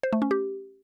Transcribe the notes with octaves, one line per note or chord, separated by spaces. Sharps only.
C5
A3
C#4
G4